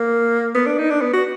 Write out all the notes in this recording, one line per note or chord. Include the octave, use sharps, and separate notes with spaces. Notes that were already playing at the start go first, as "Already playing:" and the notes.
Already playing: A#3
B3
D4
D#4
D4
B3
F#4